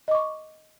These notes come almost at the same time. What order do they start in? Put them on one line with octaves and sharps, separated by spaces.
D#5 D6 C#6